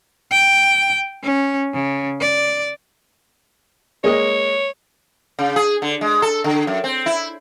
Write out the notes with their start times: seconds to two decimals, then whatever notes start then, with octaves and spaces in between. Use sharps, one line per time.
0.31 G5
1.23 C#4
1.73 C#3
2.20 D5
4.04 G#3 A#3 C#5 D#5
5.39 C#3
5.56 G#4
5.82 D3
6.01 G#3
6.22 A4
6.44 D3
6.67 F#2
6.84 C4
7.06 E4